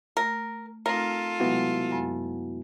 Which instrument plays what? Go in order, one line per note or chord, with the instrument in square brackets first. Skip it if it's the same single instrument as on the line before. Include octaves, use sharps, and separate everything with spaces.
[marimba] A3 [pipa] A#4
[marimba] A3 C4 D#4 [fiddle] F4 A4 [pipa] A#4
[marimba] C3 F#3 G#3 [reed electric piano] B3 E4 F#4
[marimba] F#2 F#3 G#5